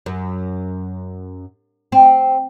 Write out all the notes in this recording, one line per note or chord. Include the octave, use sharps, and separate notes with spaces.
F#2
C4